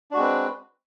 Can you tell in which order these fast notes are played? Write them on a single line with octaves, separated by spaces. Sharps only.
D4 F#4 G#3 C4 B4